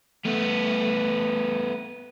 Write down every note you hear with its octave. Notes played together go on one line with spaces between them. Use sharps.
A3 B3